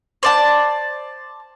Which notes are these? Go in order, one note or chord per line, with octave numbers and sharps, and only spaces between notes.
C5 D5 A5